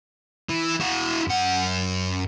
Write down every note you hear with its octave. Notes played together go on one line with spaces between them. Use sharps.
E3
E4 F#4
F#2 F#5